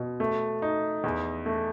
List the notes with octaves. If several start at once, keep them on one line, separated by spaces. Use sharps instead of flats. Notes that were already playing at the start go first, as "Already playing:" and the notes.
Already playing: B2
A3
D#4
E2
A3